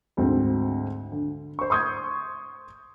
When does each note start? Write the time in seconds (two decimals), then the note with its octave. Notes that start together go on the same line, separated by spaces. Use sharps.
0.17 D2 G#2 C4
1.12 D3
1.59 C5 C#6
1.70 C6 C#6 D#6 G6 G#6